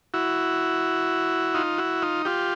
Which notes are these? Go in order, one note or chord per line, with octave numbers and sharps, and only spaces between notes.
E4 F#4
D#4 F4
E4 F#4
D#4 F4
F4 G4